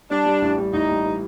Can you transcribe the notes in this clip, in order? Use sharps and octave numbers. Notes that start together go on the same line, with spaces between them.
G3 D4
G3
A1
G3
A1 D#4
G2
E3